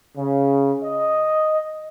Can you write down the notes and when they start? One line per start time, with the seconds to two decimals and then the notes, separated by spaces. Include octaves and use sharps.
0.17 C#3
0.84 D#5